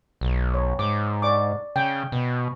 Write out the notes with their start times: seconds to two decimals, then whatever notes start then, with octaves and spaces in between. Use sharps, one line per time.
0.21 B1
0.54 C#5
0.79 G#2 D6
1.22 D5 C#6 D6
1.76 C#3 G5
2.12 B2